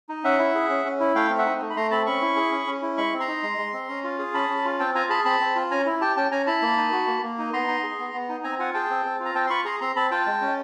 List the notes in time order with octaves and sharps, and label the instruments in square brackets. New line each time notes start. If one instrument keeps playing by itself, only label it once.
[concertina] D#4
C#4 E5 F#5
E4
G#4
C#4
C#4
E4
A3 F5 G5
C4
E5 F#5
D#4
A3
B5
A3 A#5 C6
C4 A5 B5
C#4 B5 C#6
E4
G#4
C#4
C#4
E4
G#3 B5 C#6
C4
A#5 C6
D#4
G#3
G#3
C4
C#4
F4
G#4
C#4 A5 B5
C#4
F4
C4 G5 A5
F4 G#5 A#5
G#4 A5 B5
C4 A5 B5
C4
F4
C#4 G#5 A#5
E4
G4 G5 A5
C#4 G5 A5
C#4 G#5 A#5
E4 A5 B5
A#3
D#4
F#4
A#3
A#3
D#4
B3 A#5 C6
D#4
G#4
B3
B3
D#4
C4 G#5 A#5
F4 F#5 G#5
G#4 G5 A5
C4
C4
F4
A#5
C4 G5 A5
C6
F4 B5 C#6
G#4 A#5 C6
C4 A#5 C6
C4 A5 B5
F4 G5 A5
G#3
C#4